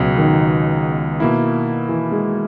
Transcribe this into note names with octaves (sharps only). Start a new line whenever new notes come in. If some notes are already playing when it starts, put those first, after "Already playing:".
Already playing: C#2 B2 F#3 G#3
D#3
B2 A#3 E4
E3
G#3